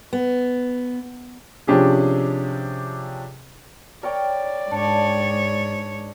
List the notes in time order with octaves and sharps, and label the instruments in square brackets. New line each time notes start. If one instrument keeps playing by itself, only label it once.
[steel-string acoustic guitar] B3
[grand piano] C3 F3 C#4 D4 G4 G#4
[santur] A#4 C#5 G5 [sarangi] D5
[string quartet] G#2 C#5 [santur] D4